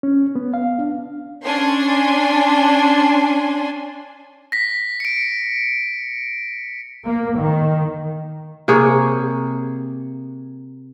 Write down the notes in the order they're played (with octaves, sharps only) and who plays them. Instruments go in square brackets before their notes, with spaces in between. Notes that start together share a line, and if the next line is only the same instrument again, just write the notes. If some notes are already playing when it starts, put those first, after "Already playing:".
[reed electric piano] C#4
B3
F5
D4
[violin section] C#4 D4 G#5 C6
[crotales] A#6 B6
C#7 D7
[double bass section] A#3
D#3
[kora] C3 A#3 G#4 C#5